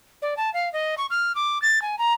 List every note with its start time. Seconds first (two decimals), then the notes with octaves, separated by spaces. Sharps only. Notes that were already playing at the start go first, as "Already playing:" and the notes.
0.22 D5
0.37 A5
0.54 F5
0.73 D#5
0.98 C#6
1.10 F6
1.35 D6
1.62 A6
1.82 G#5
1.99 A#5